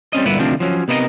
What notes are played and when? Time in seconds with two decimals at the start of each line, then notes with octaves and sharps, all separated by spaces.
0.13 G3 C4 C#4 D#5
0.26 G2 A#2 D3 B3 E4 B4
0.39 D2 C3 D#3 F3 C4 D4
0.60 F3 F#3 C#4
0.88 C3 B3 D#4 E4 A#4 D#5